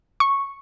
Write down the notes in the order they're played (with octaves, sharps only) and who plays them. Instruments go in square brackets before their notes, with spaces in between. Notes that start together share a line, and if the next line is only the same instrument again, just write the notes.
[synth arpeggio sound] C#6